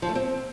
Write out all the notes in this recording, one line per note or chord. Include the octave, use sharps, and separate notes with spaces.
F3
A3
C4